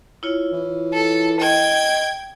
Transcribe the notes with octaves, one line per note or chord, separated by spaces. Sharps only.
E4 F4 C#5
E3
A4
D#5 G5 G#6